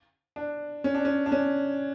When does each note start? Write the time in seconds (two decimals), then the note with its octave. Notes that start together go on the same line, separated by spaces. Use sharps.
0.36 D4
0.84 C#4
0.95 D4
1.05 C#4
1.26 D4
1.32 C#4